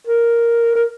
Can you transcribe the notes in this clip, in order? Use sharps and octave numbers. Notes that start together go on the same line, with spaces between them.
A#4
A#4